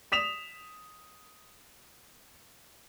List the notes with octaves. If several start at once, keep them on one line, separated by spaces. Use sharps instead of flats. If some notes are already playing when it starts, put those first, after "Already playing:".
D#6 B6 E7 F7